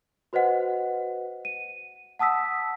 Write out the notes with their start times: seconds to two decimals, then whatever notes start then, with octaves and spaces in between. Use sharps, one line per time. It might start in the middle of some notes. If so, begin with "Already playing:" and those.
0.33 F#4 B4 C5 D#5 F#5
1.45 D#7
2.19 F#5 A5 D#6 E6 B6